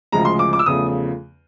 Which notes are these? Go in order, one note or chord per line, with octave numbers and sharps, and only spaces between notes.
D2 C#3 F3 G#3 A#5
C6
D6
D6
E6
E2 C#3 F3 A3 D#6